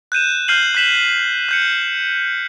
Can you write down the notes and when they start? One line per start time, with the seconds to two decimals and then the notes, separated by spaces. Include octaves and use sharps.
0.12 F#6 G6 D#7 E7
0.48 F6 G6 C7 D#7 F#7
0.75 F#6 G6 B6 E7 F#7
1.49 F#6 G6 C#7